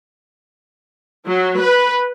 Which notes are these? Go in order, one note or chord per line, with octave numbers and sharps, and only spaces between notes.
F#3
B4